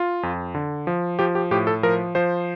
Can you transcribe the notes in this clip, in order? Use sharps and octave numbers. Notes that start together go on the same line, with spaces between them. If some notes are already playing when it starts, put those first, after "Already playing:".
Already playing: F4
F2
D3
F3
F3 G4
G4
A2 G4
A4
F3 A#4
F3 C5